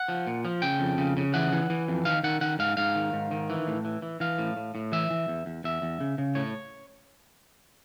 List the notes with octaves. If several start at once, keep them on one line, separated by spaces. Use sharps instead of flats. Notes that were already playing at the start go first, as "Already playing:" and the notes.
Already playing: F#5
F3
A#2
F3
C#3 G5
F2
C#3
C#3
E3 F#5
E3
E3
F2
D#3 F5
D#3 F#5
D#3 F#5
G#2 F5
G#2 F5
D#3
G#2
D#3
E3
A2
E3
E3
E3 F5
A2
A2
A2
E3 E5
E3
E2
E2
E2 E5
E2
C#3
C#3
A2 C#5